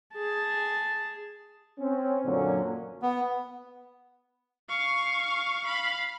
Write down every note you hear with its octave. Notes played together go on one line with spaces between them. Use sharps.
G#4 A5
C4 C#4
F#2 A#2 D3 F#3 A#3 C#4
B3
F5 C#6
F5 B5